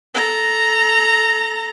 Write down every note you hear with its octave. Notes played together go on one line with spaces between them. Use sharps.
A4 A#5